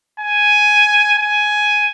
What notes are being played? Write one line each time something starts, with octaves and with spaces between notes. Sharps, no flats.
G#5
G#5